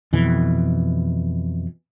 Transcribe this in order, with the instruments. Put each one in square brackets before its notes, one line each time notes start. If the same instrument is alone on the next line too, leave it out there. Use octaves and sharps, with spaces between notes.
[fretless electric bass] F2 B2 E3